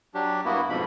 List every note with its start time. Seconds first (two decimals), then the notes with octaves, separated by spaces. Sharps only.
0.14 F#3 D4 G4
0.45 G2 A#3 B3 E4 F#4
0.69 F2 G#2 B2 F3 B5